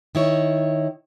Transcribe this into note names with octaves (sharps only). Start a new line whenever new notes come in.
D#3 E4 C#5